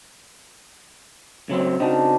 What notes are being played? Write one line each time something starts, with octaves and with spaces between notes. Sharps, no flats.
C#3 F#3 C4
C#3 C4 D4 D#4 F#4